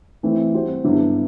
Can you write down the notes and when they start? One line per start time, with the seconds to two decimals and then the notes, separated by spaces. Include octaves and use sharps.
0.23 E3 A3 C4 E4
0.54 G3 C4 F#4 C5
0.84 G2 D3 F#3 B3 E4